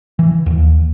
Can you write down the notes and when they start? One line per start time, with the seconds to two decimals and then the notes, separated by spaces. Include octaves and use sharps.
0.19 E3
0.46 D#2